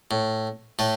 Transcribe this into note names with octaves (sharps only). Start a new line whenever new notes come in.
A2
A2 A3